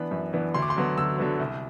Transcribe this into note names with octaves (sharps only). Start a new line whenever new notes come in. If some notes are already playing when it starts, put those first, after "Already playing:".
Already playing: E3 B3 D4 B5
F#2
E3 B3 D4
D2 C6
D6
C6
D3 F#3 B3
D2 E6
D3 F#3 B3
C2